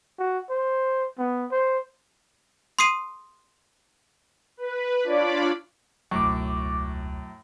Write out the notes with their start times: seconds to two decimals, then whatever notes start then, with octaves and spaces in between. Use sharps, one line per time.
0.19 F#4
0.50 C5
1.19 B3
1.51 C5
2.79 C6 D#6 C7 D#7
4.57 B4
5.04 D4 F4 C#5 D5 B5 D6
6.11 E1 C#2 F#2 A2 C#6 D6